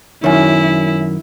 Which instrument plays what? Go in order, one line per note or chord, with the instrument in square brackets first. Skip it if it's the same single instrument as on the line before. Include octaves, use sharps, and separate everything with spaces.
[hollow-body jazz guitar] F#2 D#3 [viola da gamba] E4 [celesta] C#5 E5 G#5